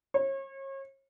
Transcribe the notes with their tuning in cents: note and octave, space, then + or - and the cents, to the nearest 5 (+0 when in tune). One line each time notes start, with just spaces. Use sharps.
C#5 -35